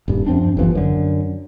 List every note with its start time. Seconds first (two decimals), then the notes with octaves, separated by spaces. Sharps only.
0.08 D#1 G2
0.27 F#2 F3 C4 D4
0.57 G1 D#2 E3 F3
0.75 F#2 D3